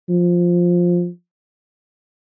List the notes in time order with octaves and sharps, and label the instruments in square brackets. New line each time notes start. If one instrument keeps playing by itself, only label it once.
[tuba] F3